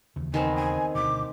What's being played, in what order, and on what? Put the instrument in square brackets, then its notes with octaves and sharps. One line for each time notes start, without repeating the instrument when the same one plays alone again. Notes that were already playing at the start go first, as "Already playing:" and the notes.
[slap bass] D#2 C#3 E3
[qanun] D#3 B3 C4 [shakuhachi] G#5
[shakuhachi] G#5
[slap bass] D2 B2 [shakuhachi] D6